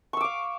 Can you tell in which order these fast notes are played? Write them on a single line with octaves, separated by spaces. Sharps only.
C#6 E6 D6 F5